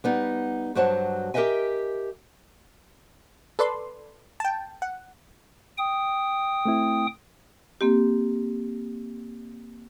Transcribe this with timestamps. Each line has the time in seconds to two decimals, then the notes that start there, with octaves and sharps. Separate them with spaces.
0.04 G3 B3 D#4
0.75 G2 F#3 F#4 C5 C#5 A5
1.34 G4 A#4 C5 D#5 E5 G#5
3.59 A4 B4 D5 C6
4.40 G5 A5
4.82 F#5
5.78 G5 D#6
6.65 A3 C4 E4
7.81 A#3 C4 G4